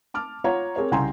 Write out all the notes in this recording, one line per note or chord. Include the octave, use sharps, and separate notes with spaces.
A5 D6 F6
F4 C#5 F#5 A#5
C4 G#4 A#4 C#5
C2 C#3 G5 G#5 A#5 C6